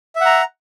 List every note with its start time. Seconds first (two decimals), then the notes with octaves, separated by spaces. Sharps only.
0.16 E5
0.21 F#5
0.26 A#5